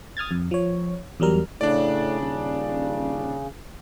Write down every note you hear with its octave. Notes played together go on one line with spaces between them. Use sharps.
D#6 F6 G#6 A6
F2
F3 C#5
E2 F#3 G3 A#4 F6
A2 C#3 D4 D5
D#1